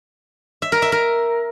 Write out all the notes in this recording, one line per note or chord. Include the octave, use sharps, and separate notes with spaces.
E5
A#4
E5
A#4